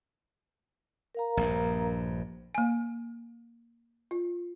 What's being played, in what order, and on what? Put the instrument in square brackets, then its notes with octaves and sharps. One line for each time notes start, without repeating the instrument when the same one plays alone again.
[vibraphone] A#4 F5 A#5
[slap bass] A#1 G2
[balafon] A#3 G#5
F4